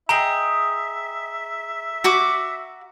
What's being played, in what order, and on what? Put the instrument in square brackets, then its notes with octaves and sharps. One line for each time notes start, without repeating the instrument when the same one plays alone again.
[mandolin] G#4 D#5 G5 [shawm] E5 [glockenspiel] A#5
[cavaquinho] F#4 D6